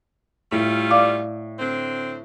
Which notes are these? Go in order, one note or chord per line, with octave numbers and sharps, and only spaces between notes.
A2 G3 A3 F4
D5 F5 D6
D3 C4